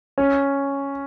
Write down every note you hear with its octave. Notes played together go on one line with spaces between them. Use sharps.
C#4